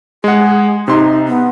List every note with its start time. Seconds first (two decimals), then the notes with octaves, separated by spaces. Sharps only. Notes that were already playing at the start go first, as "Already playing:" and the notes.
0.24 G#3 G#4 F#5
0.88 C3 D#4 C6
1.28 B3